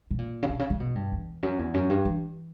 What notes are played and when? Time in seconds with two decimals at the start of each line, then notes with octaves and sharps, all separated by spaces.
0.11 B2
0.18 A#2
0.43 C#3
0.49 B2
0.59 C#3
0.70 C#3
0.80 B2
0.95 G2
1.12 E2
1.43 F#2
1.59 E2
1.74 F#2
1.89 G2
2.05 E3